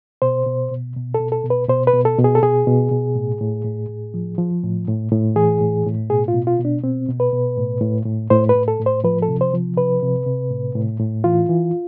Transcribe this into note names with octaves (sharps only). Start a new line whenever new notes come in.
B2 C5
B2
B2
B2
A4
B2
A4
B2
B4
B2 C5
B4
B2
A4
B2
G#4
A4
B2 G#4
B2
B2
A2
A2
A2
A2
F3
F3
A2
A2
A2
E3 G#4
A2
A2
B2 G#4
F4
B2
F4
B2
D4
B2 C4
B2
B4
B2
A2
A2
A2
A2 C5
B4
A2
A4
A2
C5
F3 B4
A4
C3
C5
F3
C3 B4
C3
C3
A2
A2
A2
E3 F4
E3